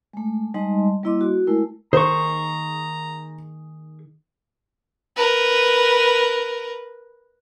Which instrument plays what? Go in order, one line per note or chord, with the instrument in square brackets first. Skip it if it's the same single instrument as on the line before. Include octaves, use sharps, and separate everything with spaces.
[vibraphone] G#3 A3
G3 G#3 D#4 D#5 A5 C6
G3 A#3 E4 D#5 C6 D6
F#4
G#3 A3 E4 A#4
[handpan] D#3 [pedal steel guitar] G#4 C#6 [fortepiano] C5 [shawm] A#5
[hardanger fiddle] A#4 B4